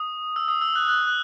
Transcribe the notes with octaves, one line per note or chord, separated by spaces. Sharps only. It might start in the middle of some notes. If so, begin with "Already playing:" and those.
Already playing: D#6
E6
D#6
E6
F#6
F#6
F#6